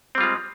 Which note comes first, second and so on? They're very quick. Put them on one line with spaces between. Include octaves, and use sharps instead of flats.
C4 G3 F4 G#3